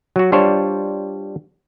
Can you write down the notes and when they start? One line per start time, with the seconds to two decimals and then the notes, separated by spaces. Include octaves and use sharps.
0.16 F#3 F#4
0.32 G3 D4 F4 C5 C#5